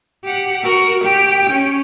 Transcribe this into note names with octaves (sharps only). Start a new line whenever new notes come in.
G4 F#5
F#4 A#4
G4 G5
C#4